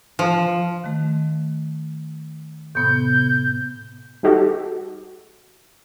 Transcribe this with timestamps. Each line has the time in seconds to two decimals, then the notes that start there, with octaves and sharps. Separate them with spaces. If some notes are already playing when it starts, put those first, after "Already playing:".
0.19 F3
0.84 D#3 A3
2.75 A2 C3 B3 G6
4.23 G3 D#4 F#4 G4 A4